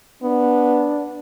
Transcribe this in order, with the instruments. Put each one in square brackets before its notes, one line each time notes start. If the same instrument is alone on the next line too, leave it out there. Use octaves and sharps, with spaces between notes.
[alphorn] B3 [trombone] D4